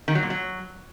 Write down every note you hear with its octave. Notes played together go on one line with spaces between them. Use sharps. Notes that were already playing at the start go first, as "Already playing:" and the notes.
D#3
F#3
A#2
F#3